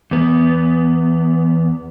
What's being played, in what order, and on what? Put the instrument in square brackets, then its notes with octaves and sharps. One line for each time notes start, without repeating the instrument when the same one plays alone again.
[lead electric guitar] E2 B3